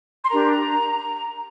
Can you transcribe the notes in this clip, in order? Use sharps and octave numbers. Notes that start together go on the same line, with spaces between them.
C6
D4 G4 A#4 A#5